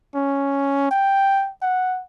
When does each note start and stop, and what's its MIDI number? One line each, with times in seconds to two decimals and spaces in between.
0.14 0.87 61
0.91 1.50 79
1.62 2.02 78